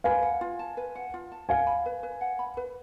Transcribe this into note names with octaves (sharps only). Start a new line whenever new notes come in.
B4 F5 G#5
F#5
F4
A5
B4
F#5
F4
A5
F5 F#5 G#5
B5
B4
B4
F#5
B5
B4